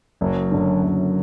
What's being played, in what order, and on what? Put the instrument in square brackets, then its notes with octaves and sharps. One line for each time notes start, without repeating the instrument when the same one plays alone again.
[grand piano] F#1 [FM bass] F#3
[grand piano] F#2 D3
F#1